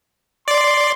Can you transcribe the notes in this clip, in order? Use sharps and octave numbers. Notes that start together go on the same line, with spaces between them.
D5 C6